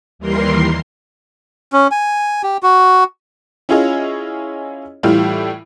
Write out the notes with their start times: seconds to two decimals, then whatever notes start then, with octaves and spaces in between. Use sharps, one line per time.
0.19 D#2 E3 G3 A#4 C6 C7
1.73 C#4
1.91 G#5
2.43 G4
2.63 F#4
3.69 C#4 E4 F4 G#4 C#5 D#5
5.03 A2 E3 G3 E4 F4